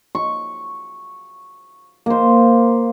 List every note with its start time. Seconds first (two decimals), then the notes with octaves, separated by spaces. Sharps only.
0.15 C#6
2.06 A#3 C5